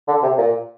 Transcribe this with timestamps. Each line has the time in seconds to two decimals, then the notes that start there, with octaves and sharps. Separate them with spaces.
0.08 D3
0.22 C3
0.38 A#2